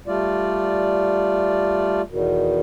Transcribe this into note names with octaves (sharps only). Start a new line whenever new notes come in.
G3 A3 F4 D5
E2 B2 D#3